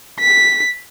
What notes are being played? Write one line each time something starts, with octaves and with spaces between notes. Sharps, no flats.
B6